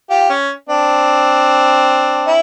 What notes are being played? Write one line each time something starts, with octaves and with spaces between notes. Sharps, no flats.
F4 G4
C#4
C4 D4
E4